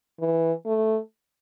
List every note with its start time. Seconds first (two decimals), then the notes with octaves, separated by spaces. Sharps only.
0.20 E3
0.66 A3